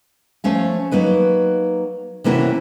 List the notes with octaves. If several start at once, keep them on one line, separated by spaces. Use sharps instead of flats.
F3 A3 C#4 F5
F#3 A#3 D#4 B4
C3 E3 A#3 C#4 E4 F#4